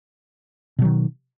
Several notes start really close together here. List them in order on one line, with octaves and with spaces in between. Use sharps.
B2 F#3 D#3